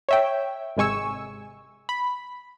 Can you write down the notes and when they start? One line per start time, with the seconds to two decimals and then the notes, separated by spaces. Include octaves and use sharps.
0.09 C#5 E5 G5
0.77 G#1 C3 G#3 G#5 C#6 E6
1.89 B5